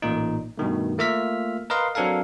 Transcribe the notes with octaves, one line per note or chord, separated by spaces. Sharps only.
A1 A#2 D#4
G2 B2 D#3 A3
A3 A#3 F4 E5 F6 B6
A#4 B4 D#5 F5 C6
F#3 C4 D4 A4 A#4 F5